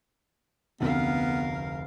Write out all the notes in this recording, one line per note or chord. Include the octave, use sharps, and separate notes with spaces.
F1 D2 B3 A#4 F5